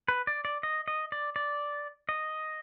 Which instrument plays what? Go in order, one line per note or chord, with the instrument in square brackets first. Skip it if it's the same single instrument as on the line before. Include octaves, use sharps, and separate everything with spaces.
[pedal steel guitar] B4
D5
D5
D#5
D#5
D5
D5
D#5